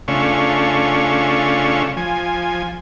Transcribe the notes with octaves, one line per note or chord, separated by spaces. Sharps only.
C#3 A3 C#4 D4 F4 C#6
F3 G#5